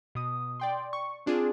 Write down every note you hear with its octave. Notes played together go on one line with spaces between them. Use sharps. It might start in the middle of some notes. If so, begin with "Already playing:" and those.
B2 D#6
D5 G5 C6
C#6
C4 D4 F4 G#4